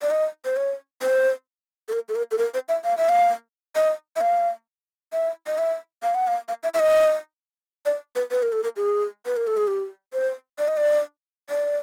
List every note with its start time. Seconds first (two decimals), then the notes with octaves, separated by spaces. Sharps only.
0.02 D5
0.11 D#5
0.45 C5
0.57 C#5
1.02 C5
1.88 A4
1.93 A#4
2.09 A4
2.16 A#4
2.31 A4
2.38 A#4
2.54 C5
2.69 E5
2.85 F5
2.97 E5
3.09 F5
3.76 D#5
4.16 E5
4.21 F5
5.13 E5
5.47 D#5
5.58 E5
6.03 F5
6.15 F#5
6.27 F5
6.48 F5
6.63 E5
6.74 E5
6.79 D#5
7.86 D5
8.16 B4
8.31 B4
8.42 A#4
8.52 A4
8.64 A#4
8.76 G#4
9.26 B4
9.37 A#4
9.47 A4
9.57 G#4
9.67 G4
10.13 C5
10.59 D5
10.68 D#5
10.77 D5
11.49 D5